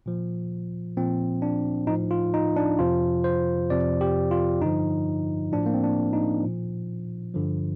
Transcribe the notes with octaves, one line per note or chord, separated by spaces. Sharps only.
A#2 F3
A#2 F3 C4
D4
A2 F3 D#4
F4
D#4
D4
F2 C3 F3 F4
C5
F2 C3 F3 D5
G4
F4
G2 D3 F3 D#4
A2 F3 D4
A#3
C4
D4
D#4
A#2 F3
G2 D3 F3